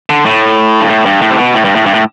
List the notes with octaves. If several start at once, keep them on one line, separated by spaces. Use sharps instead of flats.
D3
A2
G2
A2
G2
A2
C3
B2
A2
G2
A2
G2
A2